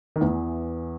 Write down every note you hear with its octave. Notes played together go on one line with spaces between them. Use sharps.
D#3
E2 E3